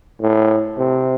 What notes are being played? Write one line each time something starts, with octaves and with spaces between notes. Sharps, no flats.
A2
C3